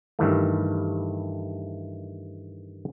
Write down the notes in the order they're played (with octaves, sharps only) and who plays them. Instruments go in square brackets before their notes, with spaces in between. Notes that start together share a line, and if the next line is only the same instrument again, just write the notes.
[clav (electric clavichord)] G2 D#3 E3 A3